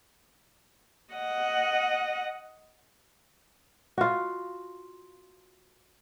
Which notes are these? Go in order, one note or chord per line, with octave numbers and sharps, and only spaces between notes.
D#5 F#5
F4 F#4